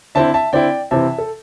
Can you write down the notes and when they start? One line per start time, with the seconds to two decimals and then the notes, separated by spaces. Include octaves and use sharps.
0.15 D3 C4 E4 E5 A5
0.34 E5 A5
0.53 D3 C4 E4 D5 G5
0.91 C3 E3 C4 E4 E5 A5
1.18 A4